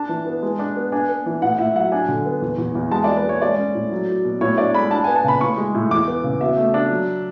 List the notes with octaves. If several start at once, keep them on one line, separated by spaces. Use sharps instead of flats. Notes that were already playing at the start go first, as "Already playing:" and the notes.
Already playing: D4 A5
E3
B3
G#3
D4
B3
D4 G#5
B3
E3
A2 F#5
A2 E5
F#3 F#5
D4 G#5
D3
B3
E2
E2
E2
G#3 A5
G#3 D5
B4
G#3 C#5
G#3 D5
C#4
A2
F#3
F#3
B2
A2 C#5
D4 D5
G#3 B5
D4 A5
B3 G#5
A5
C#3 B5
A2 C#6
G#3
A2
E2 D6
B3
C#3
B2 E5
A3
D4
F#3